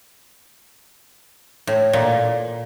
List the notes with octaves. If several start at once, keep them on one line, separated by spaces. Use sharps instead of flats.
A2
A#2